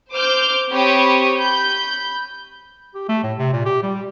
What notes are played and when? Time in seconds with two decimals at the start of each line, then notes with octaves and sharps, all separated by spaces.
0.12 C5 D6 F6 G6
0.72 C4 G4 C#5 B5 C#6 D#6
1.38 B5 G6
2.95 G4
3.09 A3
3.24 A2
3.38 C3
3.53 A#2
3.66 G4
3.83 G3